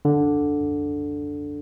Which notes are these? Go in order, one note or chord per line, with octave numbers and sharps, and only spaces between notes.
D3